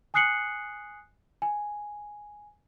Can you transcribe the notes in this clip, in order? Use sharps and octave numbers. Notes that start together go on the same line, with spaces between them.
G#5 D#6 F#6 C7 C#7 F#7
G#5